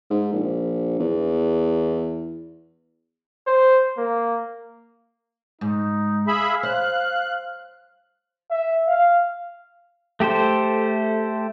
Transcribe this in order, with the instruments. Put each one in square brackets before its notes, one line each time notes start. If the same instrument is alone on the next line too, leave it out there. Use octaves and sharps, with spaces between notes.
[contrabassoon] G#2
A#1
E2
[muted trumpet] C5
A#3
[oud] G#2 [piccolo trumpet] D#4
[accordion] G#4 E5 B5 [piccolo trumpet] F5
[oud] C5 [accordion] F#6
[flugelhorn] E5
F5
[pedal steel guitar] A3 G4 A4 C5